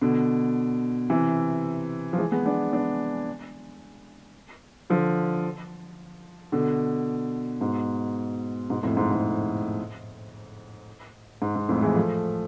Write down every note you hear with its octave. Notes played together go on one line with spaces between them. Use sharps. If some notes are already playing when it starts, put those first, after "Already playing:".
B2 D3
C3 E3
F3
E3 G#3
G#3 B3
B3 D4
B3 D4
D3 F3
B2 D3
G#2 B2
G#2 B2
F2 A2
G#2
G#2
G#2
G#2
F2 A2
E3 G#3
F3 A3